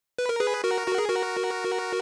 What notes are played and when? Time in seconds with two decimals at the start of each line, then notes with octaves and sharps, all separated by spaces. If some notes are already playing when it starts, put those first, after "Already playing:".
0.19 B4
0.29 A#4
0.40 G#4 B4
0.64 F#4 A#4
0.88 F#4
0.98 G#4
1.08 F#4 A#4